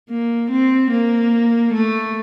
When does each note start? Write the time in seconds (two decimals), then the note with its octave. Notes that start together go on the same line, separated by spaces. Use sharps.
0.10 A#3
0.50 C4
0.91 A#3
1.74 A3